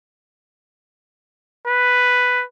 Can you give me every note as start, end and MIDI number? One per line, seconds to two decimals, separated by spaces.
1.68 2.44 71